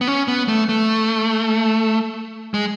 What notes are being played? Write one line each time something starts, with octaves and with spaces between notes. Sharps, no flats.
B3
C#4
B3
A3
A3
G#3